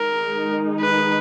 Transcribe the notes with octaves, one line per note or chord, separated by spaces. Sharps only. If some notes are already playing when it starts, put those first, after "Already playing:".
Already playing: D#3 G#3 D#4 A#4
B4